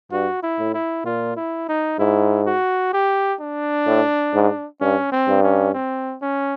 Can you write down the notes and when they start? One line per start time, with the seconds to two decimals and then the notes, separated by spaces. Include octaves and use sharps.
0.11 G2 F#4
0.43 E4
0.59 A2
0.74 E4
1.05 A#2 F4
1.37 E4
1.69 D#4
1.99 G#2 E4
2.46 F#4
2.93 G4
3.40 D4
3.87 A2
4.34 G#2
4.81 G2 C#4
5.12 C4
5.28 G2
5.43 C#4
5.74 C4
6.22 C#4